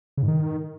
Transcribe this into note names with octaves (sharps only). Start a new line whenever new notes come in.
C#3
G#2
D#3